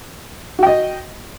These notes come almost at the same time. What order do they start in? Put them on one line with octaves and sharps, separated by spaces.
F#4 G5 D#5